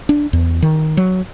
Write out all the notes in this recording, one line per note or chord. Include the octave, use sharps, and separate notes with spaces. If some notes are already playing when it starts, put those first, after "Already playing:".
D4
E2
D#3
F#3